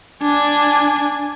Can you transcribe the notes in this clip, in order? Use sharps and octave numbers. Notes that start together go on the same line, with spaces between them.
D4 G#5